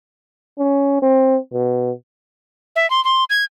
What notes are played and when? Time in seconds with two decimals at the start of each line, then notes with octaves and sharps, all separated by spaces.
0.59 C#4
1.02 C4
1.54 B2
2.76 E5
2.90 C6
3.05 C6
3.30 G#6